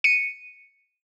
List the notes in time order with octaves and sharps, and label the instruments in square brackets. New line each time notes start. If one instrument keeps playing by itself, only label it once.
[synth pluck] C#7 D#7